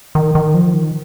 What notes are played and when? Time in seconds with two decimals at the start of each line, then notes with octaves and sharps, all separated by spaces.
0.15 D#3
0.35 D#3
0.54 F3
0.74 D#3